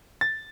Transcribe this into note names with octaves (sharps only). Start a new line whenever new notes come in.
A6